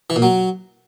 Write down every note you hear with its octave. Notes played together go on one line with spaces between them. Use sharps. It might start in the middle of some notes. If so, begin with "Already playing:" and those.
E3
A#2
F#3